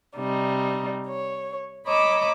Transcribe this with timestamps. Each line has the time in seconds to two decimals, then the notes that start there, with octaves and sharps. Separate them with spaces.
0.17 C3 G3 D#4
1.07 C#5
1.85 C#5 D#5 A#5 B5 D6 E6